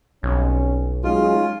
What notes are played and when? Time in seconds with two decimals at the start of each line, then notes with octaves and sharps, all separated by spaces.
0.23 B1 G3 C4 C#4
1.04 F#3 G#3 C#4 D#4 F4 G#4